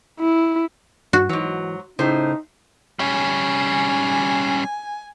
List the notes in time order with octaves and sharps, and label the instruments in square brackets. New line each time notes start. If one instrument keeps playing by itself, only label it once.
[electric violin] E4
[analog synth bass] G2 [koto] F#4
[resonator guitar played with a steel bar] G#2 F#3 [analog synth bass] E3
[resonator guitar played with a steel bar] A2 C5 [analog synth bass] C#3 [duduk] D#4
[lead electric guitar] G3 C#4 [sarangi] G#5